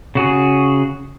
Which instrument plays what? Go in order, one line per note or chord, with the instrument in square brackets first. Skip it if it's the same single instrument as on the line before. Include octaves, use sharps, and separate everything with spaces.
[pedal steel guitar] C#3 F#4 G#4